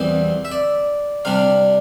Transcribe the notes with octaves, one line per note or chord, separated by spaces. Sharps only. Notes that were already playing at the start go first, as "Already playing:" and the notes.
Already playing: E2 E3 G3 C4 C5
E5
D5
C3 G3 D4 F5